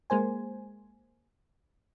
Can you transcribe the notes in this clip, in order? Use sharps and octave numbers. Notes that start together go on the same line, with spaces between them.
G#3 A#3 C5 G#5